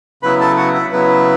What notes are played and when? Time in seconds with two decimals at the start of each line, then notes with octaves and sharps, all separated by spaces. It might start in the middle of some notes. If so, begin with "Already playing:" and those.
0.23 C#3 F#3 B3 E4 B4 B5
0.40 A4 A5
0.57 F#4 F#5
0.74 E4 E5
0.92 C#3 F#3 B3 E4 B4